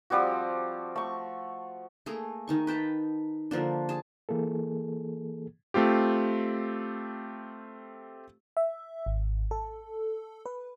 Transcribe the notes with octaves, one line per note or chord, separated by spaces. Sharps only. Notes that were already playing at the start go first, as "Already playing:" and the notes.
F3 G3 C4 F#4
A3 C#6
A3 A#3 G#4 A#5
D#3 D#4 C#6
B4 G5 A5 A#5
D3 F3 A#3 D4
G#4 A5
E3 A#3 G#4 A4
A3 C4 F4 G4
E5
G#1
A4
B4